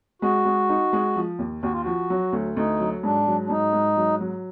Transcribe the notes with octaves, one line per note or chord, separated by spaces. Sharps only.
G#3 F#4
G#3
D#4
G#3
F3
D#2
D#2 F#4
F4
F3 F#4
F#3
D2
D2 D#4
F#3
G#2 D4
F#3
D4
G#2 D#4
G#2
F#3
F#3